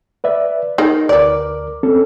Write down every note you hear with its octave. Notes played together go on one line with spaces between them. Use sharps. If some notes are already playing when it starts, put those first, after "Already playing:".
B4 D5 E5
D#4 G#4 A#4 D#5
D2 A#4 B4 D5 D6
C4 C#4 A4